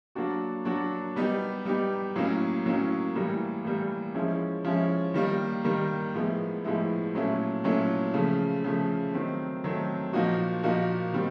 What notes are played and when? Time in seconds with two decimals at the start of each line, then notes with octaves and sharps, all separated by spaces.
0.15 F#3 A#3 D4 F#4
0.65 F#3 A#3 D4 F#4
1.16 G3 B3 D#4 G4
1.65 G3 B3 D#4 G4
2.16 A2 F#3 A#3 C#4
2.66 A2 F#3 A#3 C#4
3.15 A2 E3 G3 A#3
3.64 A2 E3 G3 A#3
4.15 F3 G#3 C#4 E4
4.64 F3 G#3 C#4 E4
5.14 D#3 G3 A#3
5.64 D#3 G3 A#3
6.14 A2 F3 G#3 B3 E4
6.64 A2 F3 G#3 B3 E4
7.15 A#2 F#3 A3 C#4 E4
7.64 A#2 F#3 A3 C#4 E4
8.14 C#3 F3 A3
8.64 C#3 F3 A3
9.14 D#3 F#3 A3 C4
9.64 D#3 F#3 A3 C4
10.13 A#2 F3 A#3 D#4 F#4
10.63 A#2 F3 A#3 D#4 F#4
11.13 D#3 G3 C4